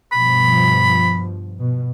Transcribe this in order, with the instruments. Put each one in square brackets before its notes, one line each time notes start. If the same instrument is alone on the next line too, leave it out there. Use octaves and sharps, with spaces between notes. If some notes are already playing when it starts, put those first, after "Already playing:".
[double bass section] G2 B2 F3 [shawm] B5
[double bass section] B2